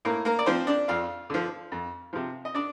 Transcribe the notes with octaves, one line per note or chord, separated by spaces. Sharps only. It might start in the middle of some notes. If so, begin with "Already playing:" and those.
A2 A#3 A#4
A#3 A#4
D5
F3 C4 C5
D4 D5
F2 F4 F5
D3 F3
F2
C3 F3
D#5
D4 D5